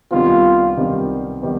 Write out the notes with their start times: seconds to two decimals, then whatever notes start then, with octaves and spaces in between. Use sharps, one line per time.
0.11 C2 C3 D#3 G3 B3 F4
0.77 C2 C3 D#3 G3 B3
1.42 D#3 G3 B3